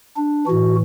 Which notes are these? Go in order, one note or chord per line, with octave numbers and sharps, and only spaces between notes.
D4
A2 E3 F#4